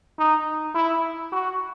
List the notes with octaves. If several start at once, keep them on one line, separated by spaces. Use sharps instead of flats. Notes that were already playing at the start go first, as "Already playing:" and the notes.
D#4
E4
F#4